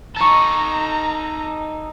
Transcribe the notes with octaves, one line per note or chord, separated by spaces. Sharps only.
D#4 A4 A#5 C#6 A6